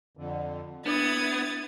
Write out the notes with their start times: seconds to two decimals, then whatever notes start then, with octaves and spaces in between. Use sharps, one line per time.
0.17 F2 D3
0.86 B3 D4 E4 D#6 G#6 A6